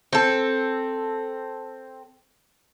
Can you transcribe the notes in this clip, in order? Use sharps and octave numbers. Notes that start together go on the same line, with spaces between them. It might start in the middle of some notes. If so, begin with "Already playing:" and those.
C4 A4